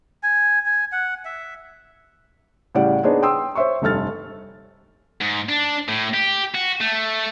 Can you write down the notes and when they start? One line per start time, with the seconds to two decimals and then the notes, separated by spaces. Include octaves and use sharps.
0.23 G#5
0.66 G#5
0.92 F#5
1.25 E5
2.75 A2 C#3 G3 G4 D5 F#5
3.03 B3 D4 D#4 G#4 C5 C#5
3.22 G5 C6 D#6 E6
3.55 C5 C#5 E5 C6 C#6
3.82 F1 G2 A4 F6 A6
5.21 G#2
5.49 D4
5.88 A2
6.13 G4
6.54 F#4
6.81 A3